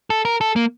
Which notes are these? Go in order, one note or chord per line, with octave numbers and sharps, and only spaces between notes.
A4
A#4
A4
A#3